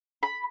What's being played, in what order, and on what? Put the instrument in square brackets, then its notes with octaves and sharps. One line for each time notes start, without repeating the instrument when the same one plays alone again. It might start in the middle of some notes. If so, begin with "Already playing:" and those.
[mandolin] B5